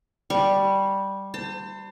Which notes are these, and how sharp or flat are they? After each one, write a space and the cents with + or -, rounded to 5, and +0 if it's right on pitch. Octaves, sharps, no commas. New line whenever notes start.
G3 -5 C#6 +10
C5 -5 A5 +40